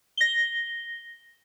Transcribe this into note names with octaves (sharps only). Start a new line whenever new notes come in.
A#6 G7